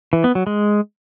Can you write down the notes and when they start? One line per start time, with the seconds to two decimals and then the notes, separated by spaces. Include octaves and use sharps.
0.13 E3
0.24 B3
0.35 F#3
0.47 G#3